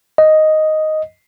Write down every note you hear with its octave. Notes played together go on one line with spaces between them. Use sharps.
D#5